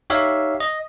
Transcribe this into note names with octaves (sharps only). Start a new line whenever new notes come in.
D#4 G4 C#5 E5 F5
D#5